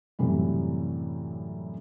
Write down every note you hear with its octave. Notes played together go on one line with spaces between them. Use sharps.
F#2 A2 C3 E3 G3